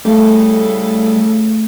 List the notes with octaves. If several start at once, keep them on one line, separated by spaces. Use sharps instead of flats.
A2 C#3 G3 A3 A4